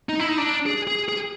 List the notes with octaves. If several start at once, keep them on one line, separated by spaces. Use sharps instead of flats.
D#4
E4
D#4
D4
G#4
G#4
G#4